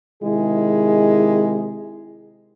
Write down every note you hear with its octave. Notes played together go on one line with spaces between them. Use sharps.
C3 D#3 G#3 E4 G#4